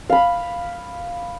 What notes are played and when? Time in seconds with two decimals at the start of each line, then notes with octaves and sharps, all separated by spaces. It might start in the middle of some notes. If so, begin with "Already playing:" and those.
0.10 F5 B5